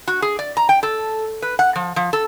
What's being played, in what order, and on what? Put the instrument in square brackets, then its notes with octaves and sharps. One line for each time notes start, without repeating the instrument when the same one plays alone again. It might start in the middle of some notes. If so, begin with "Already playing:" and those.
[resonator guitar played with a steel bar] F#4
G#4
D5
A#5
G5
A4
B4
F#5
F3
F3
A4